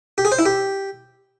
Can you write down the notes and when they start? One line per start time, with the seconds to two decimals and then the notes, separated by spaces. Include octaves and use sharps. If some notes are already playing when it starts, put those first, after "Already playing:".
0.18 G4
0.25 G#4
0.32 C5
0.39 E4
0.46 G4